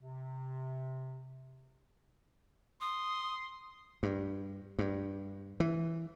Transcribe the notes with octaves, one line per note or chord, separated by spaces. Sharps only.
C3
C6 D#6
G2
G2
E3